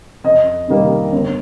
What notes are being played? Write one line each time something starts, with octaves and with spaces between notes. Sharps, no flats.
F2 D#5
C3 D#3 G3 A#3
G1